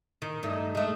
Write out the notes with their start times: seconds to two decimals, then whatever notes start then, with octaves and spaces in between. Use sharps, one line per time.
0.22 D#3
0.43 G2 A3 D#4
0.75 G#3 A3